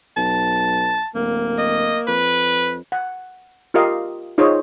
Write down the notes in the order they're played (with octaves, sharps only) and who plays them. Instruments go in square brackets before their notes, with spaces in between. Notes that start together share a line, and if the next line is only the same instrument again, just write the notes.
[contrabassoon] B1 [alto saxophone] A5
[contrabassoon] D1 [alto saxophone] A#3
[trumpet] D#5
[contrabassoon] F2 [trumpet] B4
[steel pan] F#5
F4 G4 A#4 D#5 F5
D#4 F4 G#4 C5 C#5 D#5